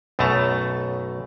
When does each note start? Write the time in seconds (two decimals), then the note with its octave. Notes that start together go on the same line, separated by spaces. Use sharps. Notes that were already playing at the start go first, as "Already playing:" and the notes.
0.19 B1 F#2 B2 A3 A5 A#5